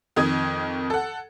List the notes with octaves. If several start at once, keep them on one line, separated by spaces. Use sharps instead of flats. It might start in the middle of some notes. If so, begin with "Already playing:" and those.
F2 D#3 D#6 G#6
A4 F#5